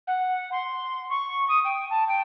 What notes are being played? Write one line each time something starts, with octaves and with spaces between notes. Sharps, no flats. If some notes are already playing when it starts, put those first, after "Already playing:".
F#5
C6
C#6
D#6
G5
A5
G5